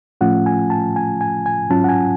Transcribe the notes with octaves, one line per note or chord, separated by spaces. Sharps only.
A2 F3 A3 C#4 F4 F#5
G#5
A5
G#5
G#5
G#5
G#2 F#3 C#4 F4 A5
F#5
G#5